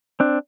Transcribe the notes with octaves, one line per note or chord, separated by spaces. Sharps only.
C4 D4